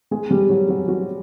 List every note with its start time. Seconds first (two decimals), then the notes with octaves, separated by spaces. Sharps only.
0.11 G#3 G#4
0.31 G3 G4
0.49 F#3 F#4
0.68 F#3 F#4
0.88 F#3 F#4